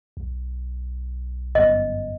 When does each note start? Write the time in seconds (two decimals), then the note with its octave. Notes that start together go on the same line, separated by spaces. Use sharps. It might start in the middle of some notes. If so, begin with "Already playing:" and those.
0.17 B1
1.55 G1 F#2 B3 D#5